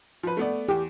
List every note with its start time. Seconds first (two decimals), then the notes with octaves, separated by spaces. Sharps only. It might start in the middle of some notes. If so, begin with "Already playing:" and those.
0.23 F3 B4
0.37 A3 B3 D5
0.69 E2 G4